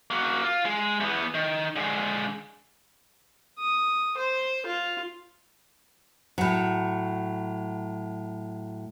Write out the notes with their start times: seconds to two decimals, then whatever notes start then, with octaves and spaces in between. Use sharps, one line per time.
0.11 A#3 F#4
0.44 F4
0.65 G#3
1.00 E2 B3
1.34 D#3
1.76 D3 G#3
3.59 D#6
4.17 C5
4.66 F4
6.38 A2 F#3